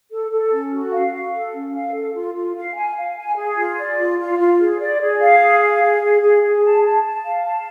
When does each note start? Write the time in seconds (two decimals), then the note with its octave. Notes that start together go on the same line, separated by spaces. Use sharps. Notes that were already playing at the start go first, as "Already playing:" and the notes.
0.11 A4
0.32 A4
0.51 C#4
0.72 F#4
0.92 F5
1.13 F5
1.34 A4
1.54 C#4
1.74 F5
1.94 A4
2.14 F4
2.35 F4
2.55 F5
2.76 G#5
2.96 F5
3.17 G#5
3.36 G#4
3.57 F4
3.77 D5
3.98 F4
4.19 F4
4.39 F4
4.59 G#4
4.80 D5
5.01 G#4
5.21 F5
5.40 G#4
5.61 F5
5.82 G#4
6.02 G#4
6.22 G#4
6.43 G#4
6.63 A5
6.84 A5
7.04 A5
7.24 F5
7.45 A5